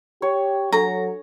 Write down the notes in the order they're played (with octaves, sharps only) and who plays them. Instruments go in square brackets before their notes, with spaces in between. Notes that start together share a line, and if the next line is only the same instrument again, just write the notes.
[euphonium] G4 [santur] C#5
[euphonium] F#3 [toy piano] D4 A4 C#6 [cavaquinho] A#5